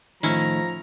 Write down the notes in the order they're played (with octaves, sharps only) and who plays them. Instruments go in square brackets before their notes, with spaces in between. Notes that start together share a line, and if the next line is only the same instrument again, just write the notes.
[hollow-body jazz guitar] A2 D#3 [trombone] F3 [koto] C#4 E4 [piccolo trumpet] A#5